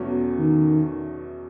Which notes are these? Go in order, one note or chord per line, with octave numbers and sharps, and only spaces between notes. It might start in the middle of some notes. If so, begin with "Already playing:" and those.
Already playing: E2 B2 F#3 A3 C#4
D#3